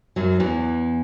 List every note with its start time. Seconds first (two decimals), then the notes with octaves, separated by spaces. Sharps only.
0.16 F#2 F#3
0.40 E2 E3